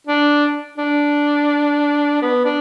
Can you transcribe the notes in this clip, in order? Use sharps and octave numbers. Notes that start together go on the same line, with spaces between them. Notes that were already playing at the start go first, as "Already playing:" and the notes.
D4
D4
B3
D4